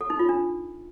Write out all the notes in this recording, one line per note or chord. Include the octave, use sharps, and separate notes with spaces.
A4
D#4
F4
D4